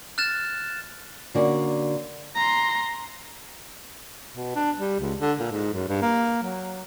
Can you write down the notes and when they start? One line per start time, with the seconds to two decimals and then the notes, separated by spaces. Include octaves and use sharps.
0.18 F6 F#6 A6 E7
1.35 D3 A#3 C#4 F#4 D5
2.36 A#5 C6
4.35 B2
4.55 D4
4.79 G3
5.00 C#2
5.21 D3
5.39 A#2
5.51 G#2
5.73 F#2
5.88 G2
6.02 A#3
6.42 F#3